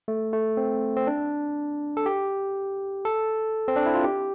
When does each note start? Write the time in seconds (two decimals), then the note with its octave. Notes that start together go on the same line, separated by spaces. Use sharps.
0.08 A3
0.33 A3
0.57 C4
0.96 C4
1.07 D4
1.97 A4
2.06 G4
3.05 A4
3.68 C4
3.76 D4
3.86 E4
3.95 F4
4.04 G4